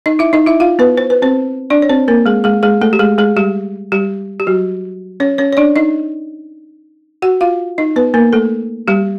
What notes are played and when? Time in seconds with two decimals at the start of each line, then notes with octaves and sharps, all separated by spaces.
0.06 D#4 D#5
0.19 E4 E5
0.33 D#4 D#5
0.46 E4 E5
0.60 F4 F5
0.79 B3 B4
0.98 C5
1.10 B4
1.22 C4 C5
1.70 D4 D5
1.82 C#5
1.89 C4 C5
2.08 A#3 A#4
2.26 G#3 G#4
2.44 G#3 G#4
2.63 G#3 G#4
2.81 A3 A4
2.93 G4
2.99 G#3 G#4
3.18 G#3 G#4
3.37 G3 G4
3.92 G3 G4
4.40 G4
4.47 F#3 F#4
5.20 C#4 C#5
5.38 C#4 C#5
5.53 C#5
5.57 D4 D5
5.76 D#4 D#5
7.22 F#4 F#5
7.41 F4 F5
7.78 D#4 D#5
7.96 B3 B4
8.14 A#3 A#4
8.33 A3 A4
8.88 G3 G4